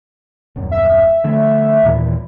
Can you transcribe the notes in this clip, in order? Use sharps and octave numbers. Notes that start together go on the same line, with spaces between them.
D#1 F#2
E5
D3 F3 A3
D#2 A#2 E3